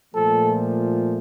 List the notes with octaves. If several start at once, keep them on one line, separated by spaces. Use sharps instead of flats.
A#2 F3 A3 A4